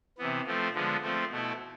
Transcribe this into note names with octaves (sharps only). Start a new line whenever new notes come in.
C3 E3 B3
F3 A3 C4
D3 F3 G#3 B3
F3 A3 C4
B2 A3 E4